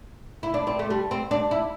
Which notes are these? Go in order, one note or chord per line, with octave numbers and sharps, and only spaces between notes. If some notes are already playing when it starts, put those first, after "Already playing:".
E4
D4
C4
A3
G3
C4
D4
E4